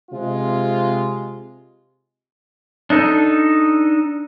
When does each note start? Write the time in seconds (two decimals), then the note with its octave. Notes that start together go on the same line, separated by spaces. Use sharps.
0.11 C3 G#3 F4
2.90 D4 D#4 A4